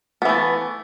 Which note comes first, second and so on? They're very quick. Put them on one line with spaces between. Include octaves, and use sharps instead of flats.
B3 E3 A3